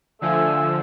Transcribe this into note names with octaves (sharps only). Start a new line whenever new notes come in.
D3 F3 A3 G#5 E6